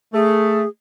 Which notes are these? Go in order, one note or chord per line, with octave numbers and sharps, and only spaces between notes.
A3 G#4